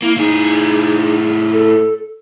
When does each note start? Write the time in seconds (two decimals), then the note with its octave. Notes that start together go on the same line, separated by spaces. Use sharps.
0.02 A#3 E4
0.18 A2 D#4 G#4
1.53 A4